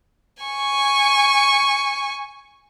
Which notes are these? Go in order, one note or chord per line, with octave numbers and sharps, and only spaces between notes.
G#5 C#6